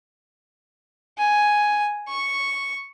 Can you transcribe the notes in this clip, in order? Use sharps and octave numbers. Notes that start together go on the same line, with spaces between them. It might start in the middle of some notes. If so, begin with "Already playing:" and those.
G#5
C#6